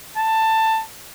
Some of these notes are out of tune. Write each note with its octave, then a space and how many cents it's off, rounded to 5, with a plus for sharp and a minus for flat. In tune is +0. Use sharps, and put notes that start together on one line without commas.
A5 +15